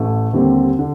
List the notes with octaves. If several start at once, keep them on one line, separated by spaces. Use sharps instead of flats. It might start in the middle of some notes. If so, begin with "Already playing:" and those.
Already playing: A1 A3
D#2 D3 G3 C4
D3